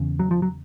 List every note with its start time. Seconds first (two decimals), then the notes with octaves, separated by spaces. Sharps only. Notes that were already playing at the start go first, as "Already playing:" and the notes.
Already playing: E2 C#3
0.19 F#3
0.31 F3
0.42 F#3